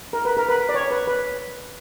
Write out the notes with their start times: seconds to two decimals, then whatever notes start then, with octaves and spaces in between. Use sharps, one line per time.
0.13 A#4
0.25 B4
0.37 A#4
0.49 B4
0.69 D5
0.74 C#5
0.91 B4
1.07 B4